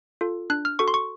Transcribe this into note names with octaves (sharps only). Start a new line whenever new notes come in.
F4 A4
D4 F#6
F6
F#4 A4 C#6
C6
C#6